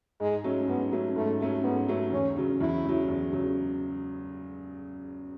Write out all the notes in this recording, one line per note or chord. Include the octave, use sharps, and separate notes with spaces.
G#2 G#3
F#3 A3 C#4
G#2 B3
F#3 A3 C#4
G#2 A3
F#3 A3 C#4
G#2 B3
F#3 A3 C#4
E2 C#4
C#3 F#3
E2 E4
C#3 F#3
E2
C#3 F#3